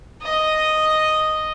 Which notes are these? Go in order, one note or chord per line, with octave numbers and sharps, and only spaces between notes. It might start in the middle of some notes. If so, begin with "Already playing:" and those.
D#5